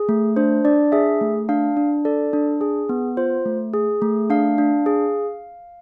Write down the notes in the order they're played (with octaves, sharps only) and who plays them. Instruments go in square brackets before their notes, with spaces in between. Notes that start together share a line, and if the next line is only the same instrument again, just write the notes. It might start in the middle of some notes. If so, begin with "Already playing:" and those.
Already playing: [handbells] G#4
A3
D4 C5
D4 D5
G#4 E5
A3
D4 F5
D4
A4 D5
D4
G#4
B3
F4 C5
A3
G#4
A3
D4 F5
D4
G#4